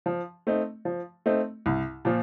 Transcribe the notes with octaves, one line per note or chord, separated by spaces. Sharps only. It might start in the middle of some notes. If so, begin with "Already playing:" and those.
F3
A3 C4 D#4
F3
A3 C4 D#4
C2
A#2 F3